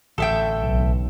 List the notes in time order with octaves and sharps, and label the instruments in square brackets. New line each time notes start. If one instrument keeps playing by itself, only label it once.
[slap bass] A1 D3 [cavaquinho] A4 E5 G5
[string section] B1